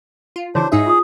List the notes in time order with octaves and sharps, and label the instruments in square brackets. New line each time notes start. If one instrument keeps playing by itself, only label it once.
[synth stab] F4
[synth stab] C#3 E3 [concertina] D4 C5 [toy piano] E4 F#4 C#5
[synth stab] G#2 D#4 E5 [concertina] G#4
[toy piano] F4 C#6 D#6